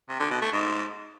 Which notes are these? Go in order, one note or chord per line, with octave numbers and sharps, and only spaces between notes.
C3
D3
B2
A3
G#2